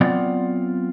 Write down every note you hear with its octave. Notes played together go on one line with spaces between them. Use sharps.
F#3 B3 C4 F4 D5 F#5